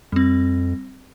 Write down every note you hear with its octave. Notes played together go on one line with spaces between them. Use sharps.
F2 G3 C4